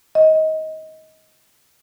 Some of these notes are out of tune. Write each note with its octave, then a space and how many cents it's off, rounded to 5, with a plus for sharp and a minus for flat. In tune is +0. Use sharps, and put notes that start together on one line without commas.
D#5 +20